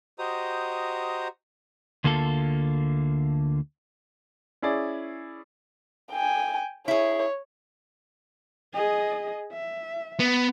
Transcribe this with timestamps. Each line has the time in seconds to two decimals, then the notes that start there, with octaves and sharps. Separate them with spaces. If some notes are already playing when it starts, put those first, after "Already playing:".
0.19 F#4 G4 C5 D#5 A#5 D#6
2.04 D2 D3 A#3 F4 A4
4.62 C#4 E4 G#4 D5
6.12 G5 G#5
6.88 E4 G#4 C#5
8.73 G#4 D#5
9.52 E5
10.20 B3